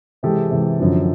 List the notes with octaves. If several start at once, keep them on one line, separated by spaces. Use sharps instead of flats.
C3 E3 G#3 G4 A4
C3 E3 G#3
F#2 D3 F3